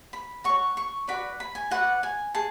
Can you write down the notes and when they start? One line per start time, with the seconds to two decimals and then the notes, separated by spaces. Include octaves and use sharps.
0.13 B5
0.44 F#4 C#5 C#6
0.77 C#6
1.08 F#4 B4 D5 B5
1.40 B5
1.55 G#5
1.71 F#4 B4 D5 F#5
2.03 G#5
2.35 G#4 A5